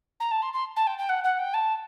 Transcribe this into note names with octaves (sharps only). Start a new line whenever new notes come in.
A#5
A5
C6
C6
A5
G5
G5
F#5
F#5
G5
A5